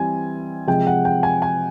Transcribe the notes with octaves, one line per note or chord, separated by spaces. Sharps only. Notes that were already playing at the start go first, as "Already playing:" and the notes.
Already playing: E3 G3 C4 E4 G#5
C3 F3 G#3 G5
F#5
G5
G#5
G#5